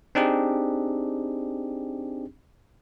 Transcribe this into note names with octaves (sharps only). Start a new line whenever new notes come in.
C4 D4 D#4 G4 G#4